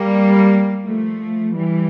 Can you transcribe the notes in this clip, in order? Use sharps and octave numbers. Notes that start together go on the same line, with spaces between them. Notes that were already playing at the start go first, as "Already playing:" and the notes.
Already playing: G3 A#3
F3 A3
E3 G3